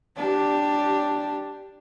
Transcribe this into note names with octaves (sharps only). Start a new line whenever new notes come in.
D4 G4